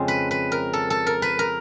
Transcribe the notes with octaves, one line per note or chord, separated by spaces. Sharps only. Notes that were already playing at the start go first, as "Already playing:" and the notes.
Already playing: F2 C#3 F3 G#3 C4
B4
B4
A#4
A4
A4
A#4
B4
A#4